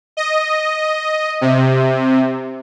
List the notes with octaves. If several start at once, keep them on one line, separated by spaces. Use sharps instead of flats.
D#5
C3